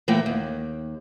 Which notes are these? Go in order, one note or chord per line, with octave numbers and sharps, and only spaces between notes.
E3 A3 A#3 F#5 G5
D#2